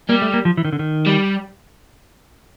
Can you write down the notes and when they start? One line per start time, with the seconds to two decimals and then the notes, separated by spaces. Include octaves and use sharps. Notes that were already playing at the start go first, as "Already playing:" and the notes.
0.09 G3 A#3
0.22 A3
0.34 A#3
0.45 F3
0.57 E3
0.65 D#3
0.72 D3
0.79 D#3
1.06 G3